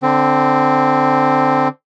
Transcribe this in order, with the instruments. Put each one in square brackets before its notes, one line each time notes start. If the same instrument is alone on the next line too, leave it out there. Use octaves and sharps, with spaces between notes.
[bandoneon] D3 C4